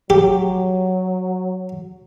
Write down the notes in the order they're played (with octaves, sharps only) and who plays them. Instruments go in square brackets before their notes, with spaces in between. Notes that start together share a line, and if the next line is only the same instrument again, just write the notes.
[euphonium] F#3 [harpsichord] G4